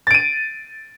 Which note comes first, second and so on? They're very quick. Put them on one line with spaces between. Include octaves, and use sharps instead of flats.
A6 D7 D#7